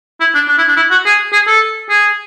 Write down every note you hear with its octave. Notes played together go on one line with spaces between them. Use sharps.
E4
D4
D4
E4
D4
E4
F#4
G#4
G#4
A4
G#4